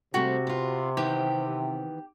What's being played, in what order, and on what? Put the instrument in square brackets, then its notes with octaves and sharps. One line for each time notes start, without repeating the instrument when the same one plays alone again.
[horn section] C3 [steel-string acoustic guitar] G3 A3 C4 [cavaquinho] F#4
[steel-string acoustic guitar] B3 F4
[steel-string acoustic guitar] D#3 E3 B3 [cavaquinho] G4